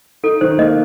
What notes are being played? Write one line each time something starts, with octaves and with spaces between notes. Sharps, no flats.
D#4 A4
D#3 C5
A#3 D#5